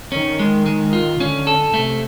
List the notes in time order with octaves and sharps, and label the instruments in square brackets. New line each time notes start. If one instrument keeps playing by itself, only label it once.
[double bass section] D#3 [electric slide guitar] C#4
[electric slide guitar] G#3
G#3
F4
[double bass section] D3 [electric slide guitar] C#4
[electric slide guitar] A4
[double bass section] C3 [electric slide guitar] A3